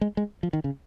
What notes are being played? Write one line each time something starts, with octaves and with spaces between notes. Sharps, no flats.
G#3
G#3
F3
D#3
C#3